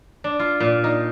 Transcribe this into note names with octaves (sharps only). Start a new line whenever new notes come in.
D4
F4
A#2
D#4